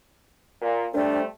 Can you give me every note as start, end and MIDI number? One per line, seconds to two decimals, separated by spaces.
0.61 0.85 46
0.94 1.25 55
0.94 1.25 57
0.94 1.25 60
0.94 1.19 62